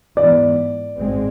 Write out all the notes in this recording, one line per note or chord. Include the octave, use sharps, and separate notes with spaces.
G#2 E3 B3 D5
G#1 G#2 G#3 C4